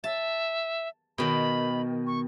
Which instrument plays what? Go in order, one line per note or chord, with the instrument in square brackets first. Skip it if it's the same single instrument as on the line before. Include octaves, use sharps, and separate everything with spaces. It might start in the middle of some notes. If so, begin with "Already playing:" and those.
[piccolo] E5 [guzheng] A5
[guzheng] B2 D#3 [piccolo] B5
[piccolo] C#6